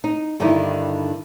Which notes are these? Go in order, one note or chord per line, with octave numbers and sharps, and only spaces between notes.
D#4
G2 D3 D#3 G3 D#4 E4